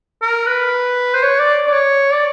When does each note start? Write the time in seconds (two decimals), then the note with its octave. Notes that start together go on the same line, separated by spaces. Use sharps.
0.22 A#4
0.47 B4
1.14 C5
1.22 C#5
1.39 D5
1.67 D5
1.73 C#5
2.13 D5